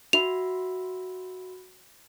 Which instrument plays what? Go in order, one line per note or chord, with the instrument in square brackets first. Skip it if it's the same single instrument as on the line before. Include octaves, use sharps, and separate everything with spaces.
[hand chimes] F#4 E5 B5 [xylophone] F7